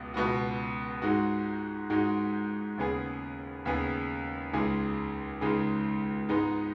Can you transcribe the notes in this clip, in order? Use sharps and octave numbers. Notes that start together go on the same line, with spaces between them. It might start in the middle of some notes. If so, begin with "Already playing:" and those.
Already playing: C#2 B2
C#2 B2 B3 F#4
G#2 G#3 D#4 F#4
G#2 G#3 D#4 F#4
D#2 C#3 B3 G#4
D#2 C#3 B3 G#4
C#2 C#3 G#3 D#4 G#4
C#2 C#3 G#3 D#4 G#4
G#2 G#3 B3 D#4